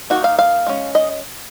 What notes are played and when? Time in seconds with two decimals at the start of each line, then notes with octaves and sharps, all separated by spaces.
0.10 D#3 A#3 D#4 F#4
0.24 F5
0.39 F5
0.66 G#3 C#4
0.95 D#5